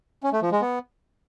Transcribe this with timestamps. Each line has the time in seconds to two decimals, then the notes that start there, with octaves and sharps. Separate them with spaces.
0.23 C#4
0.33 A3
0.42 F3
0.52 G#3
0.61 B3